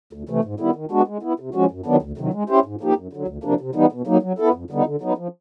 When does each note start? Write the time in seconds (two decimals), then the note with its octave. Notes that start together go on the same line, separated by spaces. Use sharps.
0.13 D2
0.29 C3 E3 A3
0.45 G#2
0.60 D#3 G3 B3 E4
0.75 D#3
0.91 G#3 B3 D4 F#4
1.08 G#3
1.23 B3 E4
1.40 C3
1.55 F3 G#3 C#4 F#4
1.71 F#2
1.86 D#3 F#3 B3 D4
2.02 D2
2.18 C3 D#3 F#3
2.33 G#3
2.49 C#4 E4 G4 C5
2.65 G#2
2.81 F3 A#3 D#4 G4
2.97 F#2
3.13 D3 F#3
3.28 D2
3.44 C3 F3 A#3 D4
3.61 C3
3.75 E3 G3 B3 D#4
3.92 B2
4.07 F#3 A#3 D#4
4.23 F#3
4.39 B3 E4 A4
4.54 F2
4.70 D3 G3 B3 D#4
4.86 D3
5.02 F#3 B3 D#4
5.18 F3